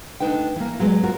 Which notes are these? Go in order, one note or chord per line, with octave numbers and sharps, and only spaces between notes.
D2 D3 D4 D#4 B4 G5
E3 A#3
F#3 G#3 B3
F4 F#4 A#4 C#5